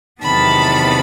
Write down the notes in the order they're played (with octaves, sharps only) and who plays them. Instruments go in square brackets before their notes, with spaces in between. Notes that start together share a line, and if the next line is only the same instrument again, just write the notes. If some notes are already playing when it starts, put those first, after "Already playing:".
[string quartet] E2 C3 D#3 F#3 B3 A5 B5